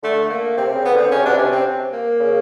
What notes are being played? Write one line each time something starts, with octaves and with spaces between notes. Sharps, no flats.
D3 A3
A#3
C3 C4
C#3
B3
D3
C4
C#3 C#4
C3
B2 D4
C3
C#4
C4
A#3
C#3